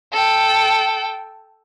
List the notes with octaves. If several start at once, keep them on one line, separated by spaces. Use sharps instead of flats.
A4 G5